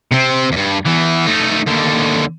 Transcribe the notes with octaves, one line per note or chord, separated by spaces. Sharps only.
C3 C4
E2 G2
E2 E3
A3 D#4
D#2 D3